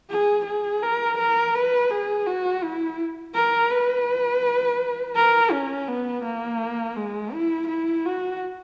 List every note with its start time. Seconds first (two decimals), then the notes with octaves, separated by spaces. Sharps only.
0.10 G#4
0.46 G#4
0.82 A#4
1.18 A#4
1.55 B4
1.91 G#4
2.26 F#4
2.63 E4
3.35 A#4
3.71 B4
5.16 A#4
5.52 C#4
5.88 B3
6.24 A#3
6.96 G#3
7.33 E4
7.68 E4
8.05 F#4